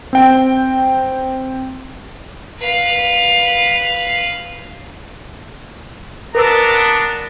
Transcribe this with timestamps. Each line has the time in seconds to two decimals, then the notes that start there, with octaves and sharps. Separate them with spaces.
0.13 C4 G5
2.59 B4 F5
6.35 B3 D4 A#4 B4 A#5 E6